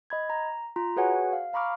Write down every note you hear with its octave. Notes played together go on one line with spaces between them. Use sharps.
D#5 B5 G#6
A#5
F4 A#5
F#4 G#4 B4 C#5 F#5 G#5
F5
F5 A#5 B5 C#6 D6 F6